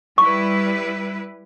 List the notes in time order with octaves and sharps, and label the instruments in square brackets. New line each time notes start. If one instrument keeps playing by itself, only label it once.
[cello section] G3 E4 B4 [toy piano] C#6